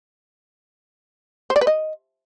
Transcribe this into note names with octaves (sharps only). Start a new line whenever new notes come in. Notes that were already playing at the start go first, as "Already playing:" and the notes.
C5
D5
B4
D#5